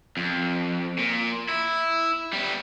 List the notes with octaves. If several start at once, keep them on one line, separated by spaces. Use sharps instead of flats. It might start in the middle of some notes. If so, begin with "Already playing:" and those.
F2
A#2
E4
G3 B3